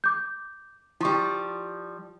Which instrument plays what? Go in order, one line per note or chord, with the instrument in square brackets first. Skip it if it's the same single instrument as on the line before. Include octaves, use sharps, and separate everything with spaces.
[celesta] D6 G6
[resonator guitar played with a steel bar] F3 G3 [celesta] E4 C#6